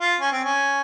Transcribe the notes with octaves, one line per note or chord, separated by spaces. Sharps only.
F4
C#4
C4
C#4